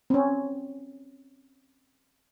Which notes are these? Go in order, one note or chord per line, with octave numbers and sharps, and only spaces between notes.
C4 C#4